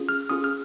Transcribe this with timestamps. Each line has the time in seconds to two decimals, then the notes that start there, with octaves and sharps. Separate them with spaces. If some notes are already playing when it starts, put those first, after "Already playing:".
Already playing: C#4 F4 G#4
0.09 F6
0.29 C#4 F4 G#4 D#6
0.44 F6